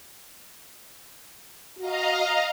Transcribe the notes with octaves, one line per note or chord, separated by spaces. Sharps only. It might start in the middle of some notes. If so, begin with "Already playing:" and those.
F#4 D#5 F5 A#5